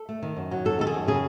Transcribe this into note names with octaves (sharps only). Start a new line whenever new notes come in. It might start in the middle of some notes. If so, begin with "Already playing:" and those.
Already playing: A4
A3
D#3
F#2
F#3
F#2 A4
D#3 A4
G#4
F#2
C#3 G#4